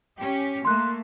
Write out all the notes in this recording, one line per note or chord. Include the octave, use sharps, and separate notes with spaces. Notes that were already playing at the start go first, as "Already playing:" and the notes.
C#4 G4
A3 A#3 C6 F#6